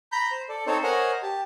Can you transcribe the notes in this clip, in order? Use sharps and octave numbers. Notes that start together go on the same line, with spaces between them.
A#5 B5 G6
C5
A4 D5
C4 D#4 A4 C5 C#5
A#4 C5 C#5 D#5 F#5 G#5
G4 A5